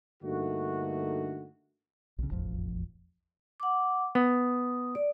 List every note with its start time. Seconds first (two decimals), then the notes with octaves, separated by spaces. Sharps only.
0.23 G2 D3 A3 A#3 D#4 F#4
2.18 B1 C#3
2.30 E1 A1 F2 F3
3.60 F#5 D6
4.15 B3 D#6
4.95 D5